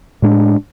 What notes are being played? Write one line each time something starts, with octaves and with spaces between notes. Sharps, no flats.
A2 G#3 D4